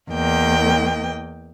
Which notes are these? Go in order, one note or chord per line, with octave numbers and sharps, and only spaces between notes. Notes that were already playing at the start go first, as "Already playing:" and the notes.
E2 A#3 D#5 G5